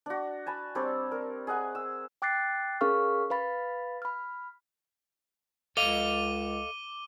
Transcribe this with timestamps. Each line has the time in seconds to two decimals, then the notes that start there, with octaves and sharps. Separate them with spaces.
0.06 D4 F#4
0.46 G#5 A5 B5
0.75 G3 C4 D4 C#5
1.11 A#4
1.47 G#4 D#5 F#5 G#5
1.75 E6
2.22 G5 D6 F#6 A6 C7
2.81 C#4 G#4 A#4 F5 C#6 F6
3.30 B4 F5 B5 A6
4.02 B5 F6
5.77 C#2 A4 D#5 F5 D6 D#7 G7